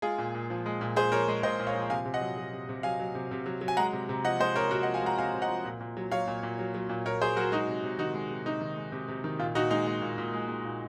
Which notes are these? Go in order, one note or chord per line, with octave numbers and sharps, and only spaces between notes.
G#3 F4 G#4
A#2
A#2
F3
G#3
A#2
A#2 G#4 C5
F3 A#4 C#5
G#3
A#2 C5 D#5
A#2
C#5 F5
F3
C3 F5 G#5
C3
D#5 F#5
F#3
F#3
C3
C3
F#3 F5 G#5
F#3
C3
C3
F#3
F#3
G#5
G#3 F#5 A#5
C3
C3
F3 D#5 F#5
G#3 C5 D#5
C3 A#4 C#5
C3 F#4 A#4
D#5 F#5
F3
F5 G#5
G#3 F#5 A#5
C3 F5 G#5
C3
D#5 F#5
F3
A#2
A#2
F#3
F#3 C#5 F5
A#2
A#2
F#3
F#3
A#2
A#2 A#4 C#5
F#3 G#4 C5
F#3 F#4 A#4
G#3 D#4 F#4
C3
C3
D#3 D#4 F#4
G#3
C3
C3 D#4
D#3
G#3
C3
C3
D#3
A#2 F4
A#2 D#4 F#4
G#3 D#4
G#3
A#2
A#2
G#3
G#3
A#2